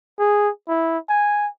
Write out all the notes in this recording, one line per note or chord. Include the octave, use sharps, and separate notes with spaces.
G#4
E4
G#5